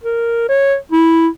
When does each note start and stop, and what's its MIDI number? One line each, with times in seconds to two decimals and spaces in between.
0.04 0.47 70
0.49 0.76 73
0.92 1.28 64